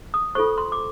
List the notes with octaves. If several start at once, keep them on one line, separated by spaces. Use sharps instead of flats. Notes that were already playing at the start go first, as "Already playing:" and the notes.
D#6
F4 A4 C5 C#6
C6
D6